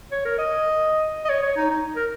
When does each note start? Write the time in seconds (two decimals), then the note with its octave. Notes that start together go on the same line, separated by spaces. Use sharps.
0.12 C#5
0.25 A#4
0.38 D#5
1.25 D#5
1.29 C#5
1.42 C#5
1.56 D#4
1.70 D#4
1.96 A#4